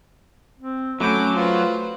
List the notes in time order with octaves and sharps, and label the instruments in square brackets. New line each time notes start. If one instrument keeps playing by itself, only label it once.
[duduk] C4
[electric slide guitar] F#3 [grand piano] A3 B5 G6 [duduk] C#4 [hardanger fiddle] D6
[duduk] F4 [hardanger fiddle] B4 C5